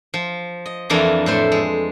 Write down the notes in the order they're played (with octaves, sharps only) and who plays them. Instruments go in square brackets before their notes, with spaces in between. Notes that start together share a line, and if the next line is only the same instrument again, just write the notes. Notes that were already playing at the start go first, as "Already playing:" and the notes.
[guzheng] F3
D#5
F2 E3 A#3 D4 A#5
A2 A3 C5
G#3